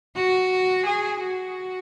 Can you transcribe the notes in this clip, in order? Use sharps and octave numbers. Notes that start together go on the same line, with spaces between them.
F#4
G#4
F#4